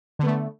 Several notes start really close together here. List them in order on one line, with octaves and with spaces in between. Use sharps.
D3 B3 A3